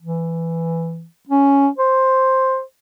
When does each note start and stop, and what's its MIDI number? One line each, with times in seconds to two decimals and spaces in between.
0.02 1.05 52
1.28 1.68 61
1.78 2.61 72